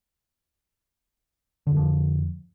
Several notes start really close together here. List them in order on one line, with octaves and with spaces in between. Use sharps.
D3 F2 F3